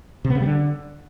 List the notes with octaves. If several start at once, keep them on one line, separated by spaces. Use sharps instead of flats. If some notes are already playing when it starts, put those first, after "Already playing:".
C3
B3
C#3
G3
D3